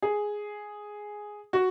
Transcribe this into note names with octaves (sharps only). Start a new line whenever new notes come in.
G#4
F#4